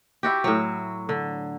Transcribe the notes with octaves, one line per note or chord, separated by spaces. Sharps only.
E4 F#4 G4
A2 F#3
D3